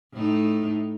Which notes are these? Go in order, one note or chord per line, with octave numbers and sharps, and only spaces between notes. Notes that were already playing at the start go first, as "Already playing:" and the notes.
A2 D#4